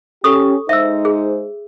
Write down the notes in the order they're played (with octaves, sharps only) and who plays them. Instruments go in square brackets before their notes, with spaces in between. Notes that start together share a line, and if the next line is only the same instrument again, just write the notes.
[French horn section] C#4 G4 [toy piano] A4 C#6 D#6
[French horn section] G#3 D#4 C5 [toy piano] E5 E6
[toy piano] G#4